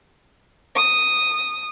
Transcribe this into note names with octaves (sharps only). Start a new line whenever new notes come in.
D#6